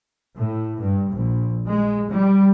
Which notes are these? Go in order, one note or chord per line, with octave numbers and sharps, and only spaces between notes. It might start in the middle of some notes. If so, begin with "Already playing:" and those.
A2
G2
A#1
G#3
G3